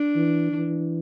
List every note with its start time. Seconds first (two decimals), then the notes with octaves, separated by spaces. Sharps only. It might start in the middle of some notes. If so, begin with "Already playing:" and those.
Already playing: D4
0.16 E3
0.52 E3